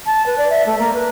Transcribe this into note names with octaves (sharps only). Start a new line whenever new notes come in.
A5
B4
D5
E5
A3
A#3
B4